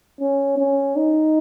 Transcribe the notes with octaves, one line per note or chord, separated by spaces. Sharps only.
C#4
C#4
D#4